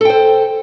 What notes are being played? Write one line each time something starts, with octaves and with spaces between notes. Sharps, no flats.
A4 C5 G5